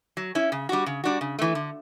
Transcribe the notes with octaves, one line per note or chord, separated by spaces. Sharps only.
F#3
C#4 E4
C#3
G3 D4 F#4
C#3
G3 D4 F#4
C#3
E3 A3
D3